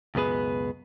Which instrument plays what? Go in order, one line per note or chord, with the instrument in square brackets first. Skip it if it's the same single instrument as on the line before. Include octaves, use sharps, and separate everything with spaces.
[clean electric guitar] C#2 F#2 B2 B3 G#4 B4